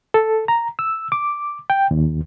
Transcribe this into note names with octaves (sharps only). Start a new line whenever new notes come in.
A4
A#5
E6
D6
G5
D#2